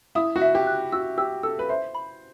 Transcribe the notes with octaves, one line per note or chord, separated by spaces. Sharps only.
E4 D#6
F#4
E5
G4
F#6
F#4 E6
G4 E6
A4 E6
B4
C5 E5
B5